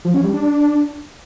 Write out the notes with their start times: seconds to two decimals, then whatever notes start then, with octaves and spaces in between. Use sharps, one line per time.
0.05 F3
0.14 C#4
0.24 G3
0.33 D4